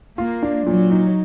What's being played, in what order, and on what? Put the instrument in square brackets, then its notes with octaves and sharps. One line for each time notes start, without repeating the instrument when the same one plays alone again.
[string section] A#3 [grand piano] F4
[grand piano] D4
[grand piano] A#2 [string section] F#3
[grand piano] D#4